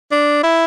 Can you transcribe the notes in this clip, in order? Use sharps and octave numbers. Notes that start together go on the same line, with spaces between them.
D4
E4